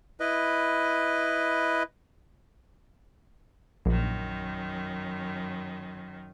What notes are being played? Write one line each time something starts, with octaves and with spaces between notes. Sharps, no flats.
E4 B4 D#5
A#1 F#2 D#3